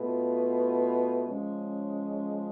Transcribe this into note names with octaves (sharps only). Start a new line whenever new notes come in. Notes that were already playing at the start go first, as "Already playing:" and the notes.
Already playing: B2 A3 F4 B4
F3 G#3 C#4